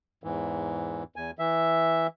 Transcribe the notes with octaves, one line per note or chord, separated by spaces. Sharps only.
E2 G#2 E3
E2 G#5
E3 E5